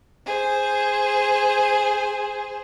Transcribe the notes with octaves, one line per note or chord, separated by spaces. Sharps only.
G#4 C5